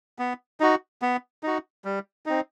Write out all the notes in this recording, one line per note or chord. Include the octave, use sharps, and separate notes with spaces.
B3
D#4 F#4
B3
D#4 F#4
G3
C4 D#4